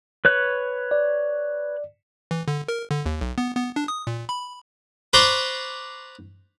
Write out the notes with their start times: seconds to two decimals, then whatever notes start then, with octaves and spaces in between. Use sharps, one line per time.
0.25 B4 C#5 F#6
0.91 D5
2.31 E3
2.48 D3
2.68 A#4
2.91 D3
3.06 D#2
3.21 B1
3.38 B3
3.56 B3
3.76 D4
3.88 D#6
4.07 A#2
4.29 B5
5.13 B4 C5 D5 A#5 C6 C#6